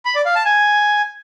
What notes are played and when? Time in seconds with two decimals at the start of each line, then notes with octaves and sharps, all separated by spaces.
0.05 B5
0.15 D5
0.25 F5
0.35 A5
0.45 G#5